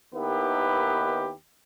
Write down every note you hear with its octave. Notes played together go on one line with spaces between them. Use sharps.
D#2 D#3 B3 E4 G4 B4